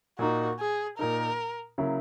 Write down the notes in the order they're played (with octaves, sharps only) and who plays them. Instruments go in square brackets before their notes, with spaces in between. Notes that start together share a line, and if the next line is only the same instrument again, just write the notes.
[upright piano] A#2 A#3 D#4 [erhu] F#4
[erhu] G#4
[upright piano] A#2 A#3 D#4 [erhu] A#4
[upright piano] C#3 F#3 A#3 E4